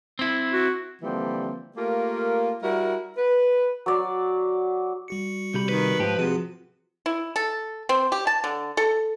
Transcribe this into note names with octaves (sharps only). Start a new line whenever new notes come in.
C4 E4
F#4
D3 E3 F3 G3 A#3 C4
A3 A#3 F4 G4 A#4
G3 E4 F#4 A#4
B4
F#3 D5
G3 F#4 C#7
C2 G4 B5
D#3 B4
G#2 F3 G4 A5
C3 F3 F#4 G#4
E4
A4
C4
G4
A5
D3
A4